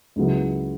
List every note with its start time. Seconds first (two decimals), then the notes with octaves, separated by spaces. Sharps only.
0.16 C#2 C#3 F#3 B3 E4